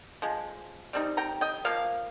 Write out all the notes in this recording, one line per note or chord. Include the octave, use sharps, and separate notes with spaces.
F3 G#3
G3 C4 D#4
G5 A#5
D#5 G5
F3 A#3 F5